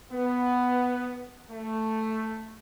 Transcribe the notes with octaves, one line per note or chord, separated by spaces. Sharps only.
B3
A3